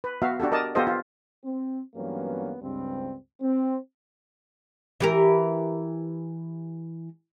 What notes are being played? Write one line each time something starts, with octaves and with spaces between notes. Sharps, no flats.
B4
B3 F#4 E5 F5
D4 F#4 G4 A4
A#4 D5 D#5 A5
B3 F4 G4 A4 C5 D#5
F4
C4
G2 E3 F#3 A#3 B3 C#4
C#2 G2 C4
C4
E3 G4 A#4